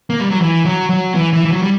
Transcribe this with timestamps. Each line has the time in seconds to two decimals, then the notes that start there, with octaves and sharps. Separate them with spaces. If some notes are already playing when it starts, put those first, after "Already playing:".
0.10 A#3
0.20 G3
0.31 F#3
0.40 E3
0.65 F#3
0.89 F#3
1.15 E3
1.33 E3
1.45 E3
1.52 F#3
1.63 G3